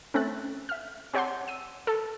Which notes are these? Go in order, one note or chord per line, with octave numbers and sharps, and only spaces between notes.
A3 C4 C#4 A4 F#6 A6
E5 F6
C4 G4 C#5 F#5 A5 C6
E6 D#7
A4 A5